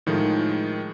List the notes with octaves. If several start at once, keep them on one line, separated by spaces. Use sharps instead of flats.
A2 D#3 F3 G#3 D#4